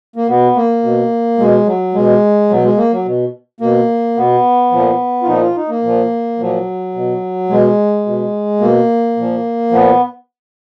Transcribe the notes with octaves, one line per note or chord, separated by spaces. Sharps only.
A#3
B2 B3
A#3
B2
B2 G#3
F#3
B2 G#3
B2 F#3
G#3
A#3
F#3
B2
B2 A#3
B2 B3
A#2 F3
F4
A#2 F3 D#4
F4
D#4
A#3
A#2 F3
A#2 F3 F#3
B2
B2 G#3
B2
B2 A#3
A#2 F3
A#2 F3 B3